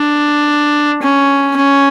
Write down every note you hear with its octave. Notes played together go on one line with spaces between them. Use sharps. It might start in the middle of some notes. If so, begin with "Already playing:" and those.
Already playing: D4
C#4
C#4